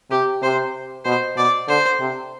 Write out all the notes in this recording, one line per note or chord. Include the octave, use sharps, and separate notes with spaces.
C3 G4
C3 C5
B2 C5
B2 D5
D3 C5
C3